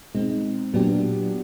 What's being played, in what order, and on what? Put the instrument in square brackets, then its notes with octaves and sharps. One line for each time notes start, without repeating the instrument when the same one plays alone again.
[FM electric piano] B2 G#3 C4 D#4
A#2 F#3 B3 D4 G4